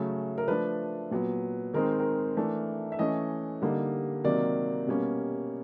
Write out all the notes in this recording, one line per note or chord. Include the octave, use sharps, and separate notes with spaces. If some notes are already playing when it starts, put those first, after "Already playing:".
Already playing: C#3 F#3 A3 C#4
A#4
F3 A3 D4 B4
A#2 F#3 B3
D#3 G#3 C4 D#4 A#4
A#4
E3 A3 D4
E5
E3 A3 C#4 D#5
D3 G3 A#3 D#4
C3 D#3 F#3 A#3 D5
B2 G3 A#3 C#4